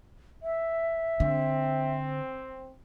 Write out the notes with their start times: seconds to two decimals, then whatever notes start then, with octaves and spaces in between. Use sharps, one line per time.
0.43 E5
1.20 D3 C4